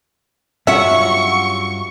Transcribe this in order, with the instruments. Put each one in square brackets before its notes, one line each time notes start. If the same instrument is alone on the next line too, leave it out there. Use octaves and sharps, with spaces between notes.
[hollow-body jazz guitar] G2 C#4 F4 [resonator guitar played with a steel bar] F#3 F#5 [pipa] E5 [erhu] C#6